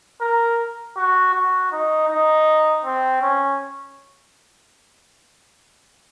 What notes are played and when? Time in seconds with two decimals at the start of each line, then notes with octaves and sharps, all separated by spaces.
0.21 A#4
0.96 F#4
1.33 F#4
1.72 D#4
2.08 D#4
2.85 C4
3.22 C#4